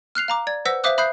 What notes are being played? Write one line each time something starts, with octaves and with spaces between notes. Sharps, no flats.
F6 F#6 C7 F7
F5 A#5 D6
D5 G#6
B4 C5 F#5 E6 A#6 B6
C5 E5 F5 D6 D#6 F#6
E5 B5 D#6 F#6 G6 C7